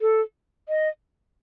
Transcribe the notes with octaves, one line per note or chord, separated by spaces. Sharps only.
A4
D#5